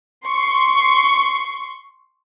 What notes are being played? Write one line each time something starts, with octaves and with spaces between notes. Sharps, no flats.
C6 C#6